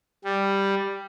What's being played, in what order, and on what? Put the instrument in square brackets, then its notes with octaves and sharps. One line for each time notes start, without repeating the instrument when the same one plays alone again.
[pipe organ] G3